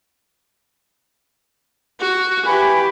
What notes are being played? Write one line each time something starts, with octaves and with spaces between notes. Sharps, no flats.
F#4
E3 G4 G#5 B5